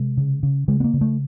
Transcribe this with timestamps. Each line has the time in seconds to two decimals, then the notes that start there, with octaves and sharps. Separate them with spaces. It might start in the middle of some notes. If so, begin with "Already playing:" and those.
Already playing: C3 G#3
0.17 C#3
0.43 C#3
0.68 C#3 G#3
0.80 B3
0.84 A#3
0.94 C#3
1.01 A3